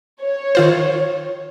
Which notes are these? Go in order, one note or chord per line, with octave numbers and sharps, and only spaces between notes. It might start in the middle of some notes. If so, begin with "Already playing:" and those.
C#5
D#3 F4 C5